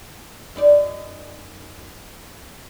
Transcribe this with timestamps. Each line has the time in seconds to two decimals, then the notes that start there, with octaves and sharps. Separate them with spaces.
0.56 F#2 D#4 D5